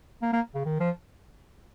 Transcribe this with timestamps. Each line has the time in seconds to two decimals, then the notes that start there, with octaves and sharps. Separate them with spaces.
0.22 A#3
0.33 A#3
0.54 C#3
0.65 D#3
0.80 F3